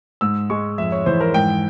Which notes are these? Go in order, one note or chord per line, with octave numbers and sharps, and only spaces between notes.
G#2 E6
G#3 C#6
F2 E5
C#5
E3 C5
A#4
G#2 G5